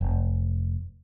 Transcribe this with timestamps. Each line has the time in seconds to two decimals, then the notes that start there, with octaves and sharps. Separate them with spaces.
0.01 F1